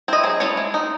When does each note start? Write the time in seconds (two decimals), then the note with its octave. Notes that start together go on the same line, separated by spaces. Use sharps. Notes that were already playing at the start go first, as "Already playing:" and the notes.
0.08 C4 E4 D#5
0.24 F#3 G#4
0.40 A3 C#4 E4 C#5
0.57 G#3
0.74 D#4